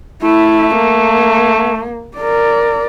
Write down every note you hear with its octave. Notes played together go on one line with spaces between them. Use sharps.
A3 E4
A#3
A#4 D5